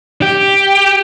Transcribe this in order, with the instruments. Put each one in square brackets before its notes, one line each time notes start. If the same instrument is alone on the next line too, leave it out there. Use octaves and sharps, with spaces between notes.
[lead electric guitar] G4